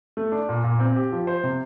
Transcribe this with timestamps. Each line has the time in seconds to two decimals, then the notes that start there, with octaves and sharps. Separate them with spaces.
0.17 A3
0.32 D4
0.49 A#2
0.64 A#2
0.79 C4
0.96 G4
1.12 F3
1.27 C5
1.43 C3